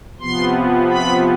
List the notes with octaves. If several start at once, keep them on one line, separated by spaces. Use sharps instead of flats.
C3 F3 B3 C6
B5